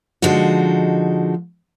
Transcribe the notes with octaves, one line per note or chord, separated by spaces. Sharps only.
D3 F3 G#3 D#4 F#4